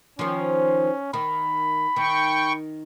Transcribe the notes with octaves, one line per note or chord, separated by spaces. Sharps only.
D#3 F3 C#4
D#3 B5
D#3 G5 C#6